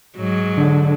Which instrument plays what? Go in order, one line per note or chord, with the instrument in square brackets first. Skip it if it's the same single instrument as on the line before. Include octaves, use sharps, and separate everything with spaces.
[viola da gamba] G#2 F#3
[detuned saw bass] D3